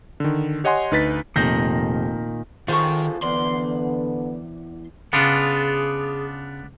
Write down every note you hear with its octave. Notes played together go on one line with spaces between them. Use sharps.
D3 D#3
G4 C#5 D#5 F#5 G#5 C6
D2 D#4 B4 A6 B6
F1 A#2 D#3 G6 A#6
D#3 F4 G#4 A4 C5 C#6
E2 D3 B3 D5 C6
C#3 B3 D4 F4 G#4